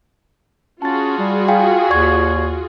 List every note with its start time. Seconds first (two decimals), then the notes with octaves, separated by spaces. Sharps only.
0.82 C#4 F4 F#4 G#4 A5 A6
1.19 G3
1.48 F5 G5 G#5
1.90 D#2 D5 C#6 G#6